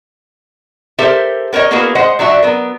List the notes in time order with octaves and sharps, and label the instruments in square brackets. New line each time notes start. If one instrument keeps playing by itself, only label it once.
[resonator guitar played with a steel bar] G4 A4 A#4 C5 E5
B3 A#4 C5 C#5 D#5
A#3 B3 E4 F#4 G#4 A#4
G#3 C5 D#5 F#5
F#3 D4 F#4 E5
F#3 B3 A#4